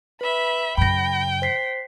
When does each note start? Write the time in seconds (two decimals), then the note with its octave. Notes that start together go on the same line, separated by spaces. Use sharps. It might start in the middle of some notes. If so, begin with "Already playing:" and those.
0.21 B4 E5 B5
0.77 F#2 C#3 G5 B5 A#6
1.42 C5 B6 C7